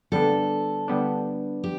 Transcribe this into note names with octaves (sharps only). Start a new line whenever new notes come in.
D3 G3 B3 D4 A4
D3 G3 B3 D4
G4